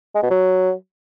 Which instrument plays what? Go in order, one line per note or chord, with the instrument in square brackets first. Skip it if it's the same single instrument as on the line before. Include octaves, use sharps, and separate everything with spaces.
[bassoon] G#3
B2
F#3